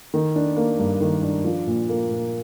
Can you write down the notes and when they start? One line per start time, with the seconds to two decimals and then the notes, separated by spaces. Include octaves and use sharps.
0.14 D#3
0.36 D4
0.57 A#3
0.79 G2
1.01 D#3
1.23 D4
1.45 F3
1.67 A#2
1.89 A#3
2.11 A#2